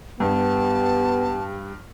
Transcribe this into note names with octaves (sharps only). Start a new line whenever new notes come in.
G2 B3 G4 A5